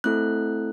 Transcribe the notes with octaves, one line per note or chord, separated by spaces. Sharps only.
A3 C4 E4 A4 F#6